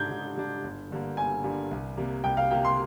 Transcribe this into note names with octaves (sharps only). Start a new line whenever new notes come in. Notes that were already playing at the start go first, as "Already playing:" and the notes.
Already playing: G#2 G3 D4 G6 G#6
G#2
G3 D4
G1
G2 D3 G3 A#3
G1 G#5
G2 D3 G3 A#3
C2
C3 G3 A#3
C2 G5
F5
C3 G3 A#3 G5
C6